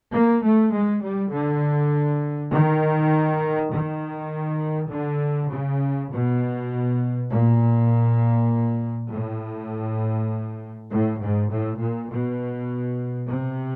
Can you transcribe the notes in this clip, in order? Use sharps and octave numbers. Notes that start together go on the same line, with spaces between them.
A#3
A3
G#3
G3
D3
D#3
D#3
D3
C#3
B2
A#2
A2
A2
G#2
A2
A#2
B2
C3